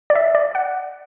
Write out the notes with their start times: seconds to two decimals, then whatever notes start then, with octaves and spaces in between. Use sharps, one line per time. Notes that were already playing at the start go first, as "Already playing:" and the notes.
0.10 D5
0.15 E5
0.35 D5
0.55 F#5